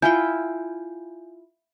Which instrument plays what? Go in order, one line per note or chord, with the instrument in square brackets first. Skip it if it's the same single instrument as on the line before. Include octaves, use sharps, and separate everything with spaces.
[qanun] E4 F4 G5 [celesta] G#5 G6